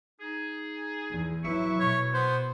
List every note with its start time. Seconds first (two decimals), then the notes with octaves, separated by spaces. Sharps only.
0.21 D#4 G#4
1.10 E2
1.45 F#3 E4 B4 E5 C#6
1.80 B2 C#5
2.14 B3 C5